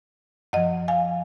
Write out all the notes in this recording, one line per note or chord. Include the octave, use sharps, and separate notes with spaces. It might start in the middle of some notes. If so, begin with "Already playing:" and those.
F#2 F3 D#5 F#5
F5 G#5